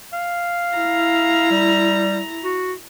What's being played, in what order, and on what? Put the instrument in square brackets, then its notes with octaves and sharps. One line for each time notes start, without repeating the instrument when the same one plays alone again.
[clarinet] F5
[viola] E4 A#5
[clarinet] G3
F#4